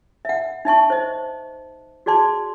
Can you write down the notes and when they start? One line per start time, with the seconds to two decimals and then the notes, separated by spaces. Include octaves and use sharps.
0.25 E5 F#5
0.65 D#4 E5 A5 C#6
0.90 C5 D#5
2.06 F#4 G#4 D5 A5 C6